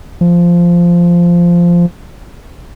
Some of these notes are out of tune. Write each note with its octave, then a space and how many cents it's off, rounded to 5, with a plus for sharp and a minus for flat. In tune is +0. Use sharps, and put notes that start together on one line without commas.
F3 -10